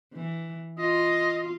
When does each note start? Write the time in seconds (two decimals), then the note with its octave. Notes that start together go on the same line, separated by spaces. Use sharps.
0.13 E3
0.78 F4 D#5